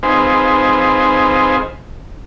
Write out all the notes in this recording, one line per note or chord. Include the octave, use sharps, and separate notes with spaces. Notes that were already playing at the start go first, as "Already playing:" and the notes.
C4 D#4 F4 G#4 B4 C5